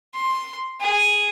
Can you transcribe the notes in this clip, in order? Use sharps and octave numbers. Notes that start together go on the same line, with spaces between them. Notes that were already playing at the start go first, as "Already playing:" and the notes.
C6
G#4